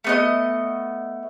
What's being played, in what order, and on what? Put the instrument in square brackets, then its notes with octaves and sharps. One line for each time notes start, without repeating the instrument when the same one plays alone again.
[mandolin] A3 B3 D#5